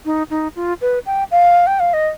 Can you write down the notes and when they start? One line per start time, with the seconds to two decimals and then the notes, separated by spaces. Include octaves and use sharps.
0.05 D#4
0.30 D#4
0.56 F4
0.81 B4
1.06 G5
1.31 F5
1.67 G5
1.80 F5
1.93 D#5